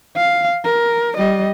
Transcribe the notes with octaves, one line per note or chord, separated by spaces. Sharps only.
F5
A#4
G3 D#5